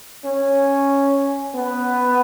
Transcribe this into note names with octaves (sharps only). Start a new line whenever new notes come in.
C#4
B3